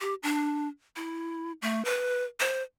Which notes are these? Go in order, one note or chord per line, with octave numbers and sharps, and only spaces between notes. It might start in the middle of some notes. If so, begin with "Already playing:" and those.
G4
D4
E4
A3
B4
C5